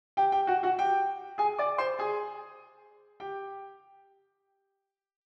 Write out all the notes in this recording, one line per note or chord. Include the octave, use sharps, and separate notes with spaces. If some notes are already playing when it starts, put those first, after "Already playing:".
G4 G5
G4 G5
F#4 F#5
F#4 F#5
G4 G5
G#4 G#5
D5 D6
C5 C6
G#4 G#5
G4 G5